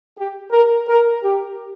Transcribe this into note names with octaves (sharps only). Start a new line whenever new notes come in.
G4
A#4
A#4
G4